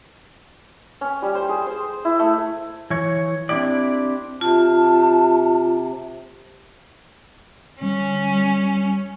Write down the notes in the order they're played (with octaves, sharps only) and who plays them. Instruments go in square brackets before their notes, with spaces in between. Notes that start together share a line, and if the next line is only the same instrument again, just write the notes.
[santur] C#4
G3
C5
G#4
C5
E4
A3
[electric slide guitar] E3 C#5
C4 D4 E4 G4 D5
[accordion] C3 [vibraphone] F4 [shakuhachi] A5
[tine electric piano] D3 G3 [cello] C#4
[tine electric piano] G3